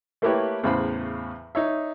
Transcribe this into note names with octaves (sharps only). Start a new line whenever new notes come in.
A3 A#3 E4 G4 B4 C#5
E2 A2 C#3 C5 B5
D#4 C#5 E5